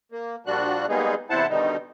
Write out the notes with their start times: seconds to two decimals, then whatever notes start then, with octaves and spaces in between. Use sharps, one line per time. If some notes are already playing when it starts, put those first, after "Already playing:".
0.12 A#3
0.46 A#2 F3 G3 D4 F#4 F#6
0.89 G3 G#3 A#3 B3 D#4 G#4
1.30 E2 C3 E4 C5 F#5 A5
1.49 B2 D3 D#3 G3 D#4